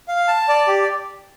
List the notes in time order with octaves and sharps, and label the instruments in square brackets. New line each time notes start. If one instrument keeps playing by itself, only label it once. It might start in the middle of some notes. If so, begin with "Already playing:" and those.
[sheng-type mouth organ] F5
A5
D5
G4